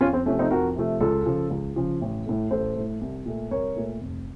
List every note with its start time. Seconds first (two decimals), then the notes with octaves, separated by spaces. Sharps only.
0.01 F2 C#4 F4
0.13 C4
0.26 C3 F3 A3 C#4
0.39 C4 D#4
0.51 F2 F#4 A#4
0.76 C3 F3 A3
1.01 C#2 F4 A4
1.26 C#3 F3
1.50 C#2
1.76 C#3 F3
2.02 A1
2.26 A2 A3
2.51 A1 A4 C5
2.76 A2 A3
3.01 C2
3.25 A#2 A3
3.51 C2 A#4 C#5
3.76 A#2 A3
4.01 F1